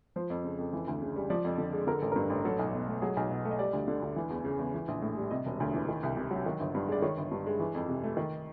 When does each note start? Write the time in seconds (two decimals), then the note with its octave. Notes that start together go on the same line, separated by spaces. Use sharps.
0.16 F3 C5
0.30 F2
0.44 C#3
0.59 F2
0.73 E3
0.88 D2
1.02 C#3
1.16 G3
1.30 F3 D5
1.45 F2
1.58 D3
1.73 G#3
1.87 D3 A#4
1.99 A1 A4
2.12 G2 A#4
2.30 A1
2.45 F#3 A4
2.59 B1
2.73 B2
2.88 A3
3.01 F#3 G#4
3.17 B1
3.31 B2
3.45 A3
3.51 D#5
3.59 G3 D5
3.73 D2
3.88 D3
4.02 D2
4.16 E3
4.30 E2
4.45 C#3
4.59 E2
4.74 E3
4.88 A#1
5.02 A2
5.17 G3
5.31 C3 D#5
5.46 E1
5.60 D2
5.74 E3
5.89 D#3
6.03 C2
6.17 C3
6.31 F#3
6.46 D#3
6.60 G1
6.75 G2
6.88 G#3 D5
7.02 D#3 C#5
7.17 G1
7.32 G2
7.46 G#3
7.59 E3
7.75 F2
7.89 C3
8.04 A3
8.17 D#3